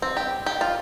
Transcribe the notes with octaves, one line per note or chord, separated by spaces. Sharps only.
C4
G4
G4
F4